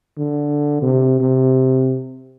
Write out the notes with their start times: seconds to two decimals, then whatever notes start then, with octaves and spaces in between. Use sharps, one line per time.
0.18 D3
0.82 C3
1.20 C3